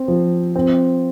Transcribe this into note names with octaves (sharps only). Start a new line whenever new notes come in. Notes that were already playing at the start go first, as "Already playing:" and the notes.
Already playing: C4
F3
C4